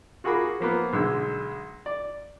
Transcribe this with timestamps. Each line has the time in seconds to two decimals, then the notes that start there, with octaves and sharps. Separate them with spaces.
0.24 F4 F#4 G#4 A#4 B5 D6
0.60 F3 A#3 B3
0.93 B1 D3 G#3 E6
1.86 D5